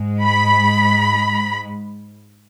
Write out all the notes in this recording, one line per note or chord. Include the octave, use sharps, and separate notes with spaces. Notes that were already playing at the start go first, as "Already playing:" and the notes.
Already playing: G#2 G#3
B5